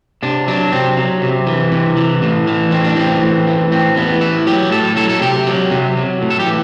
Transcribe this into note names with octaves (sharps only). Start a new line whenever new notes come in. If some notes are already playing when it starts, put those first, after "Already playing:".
C3 D4
F#3 D4
C3 C4
F#3
C3
E3
C3
E3
A2
E3
A2 C4
D4
E3 C4
A2
E3
A2 C4
E3 B3
A2 E4
F#3 G4
A2 A4
F#3 A4
A4
C3 G4
F#3
C3
F#3
A2
A4
G4
E3